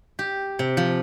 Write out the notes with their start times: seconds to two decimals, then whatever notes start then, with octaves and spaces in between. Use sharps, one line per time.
0.19 G4
0.59 C3
0.77 F3